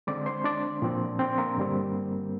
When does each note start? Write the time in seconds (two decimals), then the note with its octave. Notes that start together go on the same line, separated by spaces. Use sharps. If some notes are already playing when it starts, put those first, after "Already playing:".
0.07 D3 G#3 C4 D5 D6
0.26 C5 C6
0.44 D4 D5
0.82 A#2 F3 C4
1.19 C4 C5
1.38 A#3 A#4
1.57 G2 D3 G3 C4